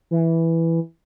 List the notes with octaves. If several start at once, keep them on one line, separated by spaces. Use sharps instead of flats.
E3